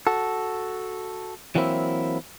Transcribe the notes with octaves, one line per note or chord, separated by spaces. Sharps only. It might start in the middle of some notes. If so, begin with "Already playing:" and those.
F#4 A4
E3 F#3 A#3 C4 E4